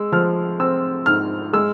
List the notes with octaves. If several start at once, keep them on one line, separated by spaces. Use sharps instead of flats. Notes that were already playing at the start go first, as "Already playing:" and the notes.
Already playing: G#3 E6
F3 F6
C4 E6
G#2 F6
G#3 E6